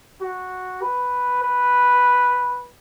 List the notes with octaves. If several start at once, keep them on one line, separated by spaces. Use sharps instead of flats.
F#4
B4
B4